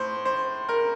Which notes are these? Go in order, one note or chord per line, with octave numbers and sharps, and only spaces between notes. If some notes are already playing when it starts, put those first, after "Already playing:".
Already playing: A2 C5
C5
A#4